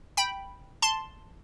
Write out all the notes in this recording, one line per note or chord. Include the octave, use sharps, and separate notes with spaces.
G5 B5
A5 C6